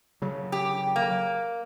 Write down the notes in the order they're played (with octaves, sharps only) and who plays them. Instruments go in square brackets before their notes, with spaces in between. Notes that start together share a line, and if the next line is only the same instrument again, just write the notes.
[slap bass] C#3 F#3
[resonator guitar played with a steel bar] G4
A#3